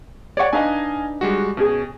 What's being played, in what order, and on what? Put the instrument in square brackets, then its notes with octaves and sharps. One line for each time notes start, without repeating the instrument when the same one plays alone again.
[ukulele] C#5 F#5 [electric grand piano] D5 C#6
[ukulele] D4 D#4 B4 [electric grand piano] D#5 F5 G#5
[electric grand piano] G3 G#3 F#4
[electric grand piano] B2 [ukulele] C#4 G#4